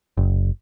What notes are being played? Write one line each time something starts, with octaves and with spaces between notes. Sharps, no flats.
F#1